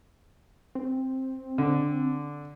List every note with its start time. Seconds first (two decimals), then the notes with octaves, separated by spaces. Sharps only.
0.75 C4
1.58 D3